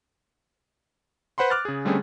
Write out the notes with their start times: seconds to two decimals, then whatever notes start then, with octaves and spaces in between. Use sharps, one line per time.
1.38 B4 C5 F#5 B5 C6
1.50 D6 F6 F#6 A6
1.65 C#3 G#4
1.85 D3 G3 A3 C4 C#4 G#4